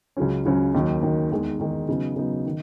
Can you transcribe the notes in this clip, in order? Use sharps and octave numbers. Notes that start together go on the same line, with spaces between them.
C#2 C#3 F#3 C#4
C#2 C#3 F#3 C#4
D#2 D#3 F#3
D#2 D#3 F#3
E2 D#3 G#3
E2 D#3 G#3
C#3 F#3 B3 D#4
C#3 F#3 B3 D#4
D#3